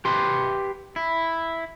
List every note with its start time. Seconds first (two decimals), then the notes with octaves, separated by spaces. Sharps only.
0.05 G4 B4 C6
0.96 E4